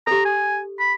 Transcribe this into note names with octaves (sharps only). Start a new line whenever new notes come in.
G4 A4 A#5
G#5
B5